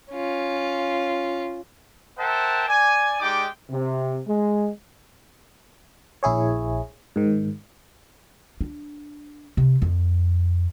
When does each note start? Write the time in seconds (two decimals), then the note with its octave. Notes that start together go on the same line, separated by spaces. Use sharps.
0.11 C#4 F4
2.19 A#4 C5 E5 F#5 G5 A5
2.68 D5 G#5
3.20 G#3 D#4 G4 D5 G5 D6
3.70 C3
4.28 G#3
6.23 A#1 E4 G#4 C#5
7.16 G#2 D#3
8.61 D4
9.57 C3
9.82 F2